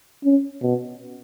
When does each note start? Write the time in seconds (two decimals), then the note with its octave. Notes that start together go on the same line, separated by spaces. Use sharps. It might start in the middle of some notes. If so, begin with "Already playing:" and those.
0.24 C#4
0.62 B2